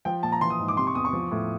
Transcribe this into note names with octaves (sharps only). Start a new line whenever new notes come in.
F3 G5
A#2 A5
A#5
E3 C6
D#6
G#2
D6
C3 C6
C#6
E2 D#6
C#6
F3
A2